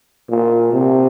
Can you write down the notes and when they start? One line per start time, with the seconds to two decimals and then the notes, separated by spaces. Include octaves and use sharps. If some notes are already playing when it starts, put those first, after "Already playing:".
0.29 A#2
0.73 C3